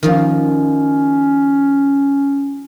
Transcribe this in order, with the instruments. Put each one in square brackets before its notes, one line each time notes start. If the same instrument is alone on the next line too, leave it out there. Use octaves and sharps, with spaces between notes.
[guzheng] D#3 F3 A#3 [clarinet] C#4